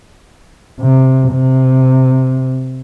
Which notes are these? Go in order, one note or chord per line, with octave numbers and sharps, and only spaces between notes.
C3
C3